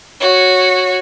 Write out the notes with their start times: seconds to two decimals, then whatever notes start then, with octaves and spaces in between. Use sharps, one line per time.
0.21 F#4 C#5